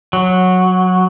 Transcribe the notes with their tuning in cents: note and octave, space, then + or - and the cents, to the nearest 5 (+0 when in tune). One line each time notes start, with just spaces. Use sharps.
F#3 -10